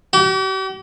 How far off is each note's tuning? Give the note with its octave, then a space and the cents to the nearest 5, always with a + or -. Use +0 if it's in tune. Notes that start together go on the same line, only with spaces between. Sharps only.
G4 -45